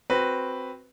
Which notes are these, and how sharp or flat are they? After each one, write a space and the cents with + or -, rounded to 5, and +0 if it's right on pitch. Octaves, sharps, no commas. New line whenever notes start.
C4 +0 F#4 +0 B4 +0